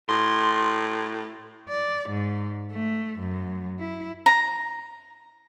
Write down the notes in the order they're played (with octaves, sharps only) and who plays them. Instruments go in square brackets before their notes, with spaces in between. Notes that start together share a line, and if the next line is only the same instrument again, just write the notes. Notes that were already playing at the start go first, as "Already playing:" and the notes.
[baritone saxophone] A2 [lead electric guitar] C6
[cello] D5
G#2
A3
F#2
E4
[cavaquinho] A#5